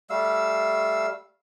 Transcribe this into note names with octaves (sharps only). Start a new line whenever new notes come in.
G3 A3 F5 E6